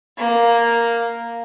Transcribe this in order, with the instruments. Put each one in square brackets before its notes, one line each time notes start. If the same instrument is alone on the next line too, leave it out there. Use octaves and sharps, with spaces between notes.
[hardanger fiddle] A#3